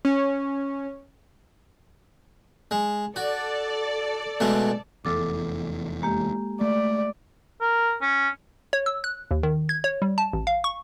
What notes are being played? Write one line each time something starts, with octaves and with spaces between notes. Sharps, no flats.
C#4
G#3
F#4 A4 D5
B2 G#3 A3
F1 E2 A4 D6
G#3 A#3 G4
A3 D5
A#4
C#4
C#5
E6
F#6
D#2
D#3
G#6
C#5
G3
A5
A1
F5
C#6